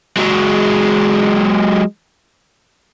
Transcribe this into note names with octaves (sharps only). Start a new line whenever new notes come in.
F#3 G#3